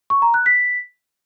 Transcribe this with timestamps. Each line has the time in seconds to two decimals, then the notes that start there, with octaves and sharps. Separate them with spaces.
0.10 C#6
0.22 A#5
0.34 F#6
0.46 B6